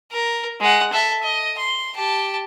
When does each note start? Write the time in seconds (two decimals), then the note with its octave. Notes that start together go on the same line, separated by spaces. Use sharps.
0.11 A#4
0.61 G#3 F#5
0.93 A4 E5
1.23 D#5
1.58 C6
1.95 G4 A5